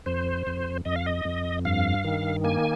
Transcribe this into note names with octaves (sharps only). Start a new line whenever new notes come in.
F2 C5
F2
F2 D#5
F5
D#5
F2
G2 F5
D#3
A#3 G#5